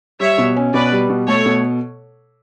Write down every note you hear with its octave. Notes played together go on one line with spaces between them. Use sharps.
G3 C#5 E5
B2
C#4
B2 B4 D5
G3
B2
A3 A4 C#5
B2